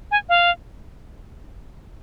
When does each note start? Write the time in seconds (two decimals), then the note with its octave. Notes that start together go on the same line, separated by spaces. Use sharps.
0.11 G#5
0.29 F5